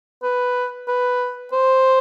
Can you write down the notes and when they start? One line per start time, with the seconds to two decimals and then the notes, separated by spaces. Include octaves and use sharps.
0.23 B4
0.88 B4
1.52 C5